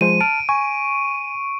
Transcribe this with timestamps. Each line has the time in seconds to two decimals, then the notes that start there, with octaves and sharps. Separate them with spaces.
0.01 F3 G#3 C5 D#7
0.21 A5 F6 D7
0.49 G#5 C#6